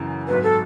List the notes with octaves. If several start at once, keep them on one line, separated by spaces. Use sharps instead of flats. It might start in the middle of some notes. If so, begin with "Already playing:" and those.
Already playing: F#2 C#3 E3
G#1 G#2 F#3 B4
A4